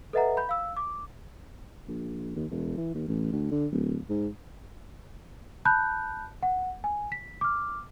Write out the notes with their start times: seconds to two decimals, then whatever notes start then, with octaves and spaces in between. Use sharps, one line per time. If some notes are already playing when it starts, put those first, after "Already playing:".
0.13 A4 B4 D#5 E5 F#5 A#5
0.37 B5 G6
0.49 F5 E6
0.77 D6
1.88 A#1
2.36 D#2
2.51 E1
2.77 E3
2.94 D#2
3.08 A1
3.33 D2
3.51 D3
3.73 D1
4.09 G#2
5.65 A5 B5 F#6 G6
6.43 F#5
6.84 G#5
7.12 B6
7.41 D6 F6